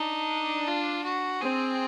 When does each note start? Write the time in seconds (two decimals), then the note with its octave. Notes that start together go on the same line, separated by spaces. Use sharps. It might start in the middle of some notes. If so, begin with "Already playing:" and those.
Already playing: D4 D#4
0.68 F4
1.04 F#4
1.42 C4 G#4